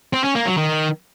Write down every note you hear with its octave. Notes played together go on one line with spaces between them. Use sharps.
C4
C#4
A#3
F#3
D#3